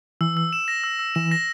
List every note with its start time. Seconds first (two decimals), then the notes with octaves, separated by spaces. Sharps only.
0.21 E3 E6
0.37 E6
0.53 E7
0.68 A#6
0.84 E6
0.99 E6
1.15 E3 E7
1.32 A#6